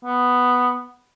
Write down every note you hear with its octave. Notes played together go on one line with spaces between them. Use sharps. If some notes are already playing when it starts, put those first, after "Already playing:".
B3